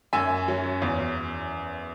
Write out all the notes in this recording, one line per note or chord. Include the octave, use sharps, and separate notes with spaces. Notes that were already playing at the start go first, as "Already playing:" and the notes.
F#2 E5 G#5
F#3 C#4
E2